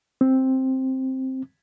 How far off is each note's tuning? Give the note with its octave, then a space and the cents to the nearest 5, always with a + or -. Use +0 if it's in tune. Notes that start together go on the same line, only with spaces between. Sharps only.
C4 +5